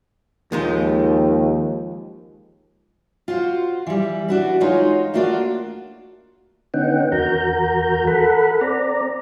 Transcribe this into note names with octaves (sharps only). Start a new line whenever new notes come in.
D#2 F3 G#3 D#4
F4 F#4 C5
E3 G3
D4 F#4 B4
G#3 D#4 F4 F#4 C#5 D#5
A3 A#3 D4 F4 F#4 D5
D3 B3 C#4 D#4 F#5 G5
E2 F#4 A#4 A#5 G6
A4 A#4 F#5 B5
C4 D5 A#5